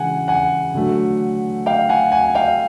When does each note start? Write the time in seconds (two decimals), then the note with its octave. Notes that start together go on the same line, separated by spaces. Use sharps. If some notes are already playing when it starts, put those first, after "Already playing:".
Already playing: C#3 E3 G#3 F#5 G#5
0.28 F#5 G#5
0.74 D3 F#3 A3
1.66 F5 G5
1.89 F#5 G#5
2.12 F#5 G#5
2.35 F5 G5